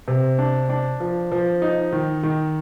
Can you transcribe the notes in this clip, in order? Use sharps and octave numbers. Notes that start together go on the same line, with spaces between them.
C3
D4
D4
F3
F3
D#4
D#3
D#3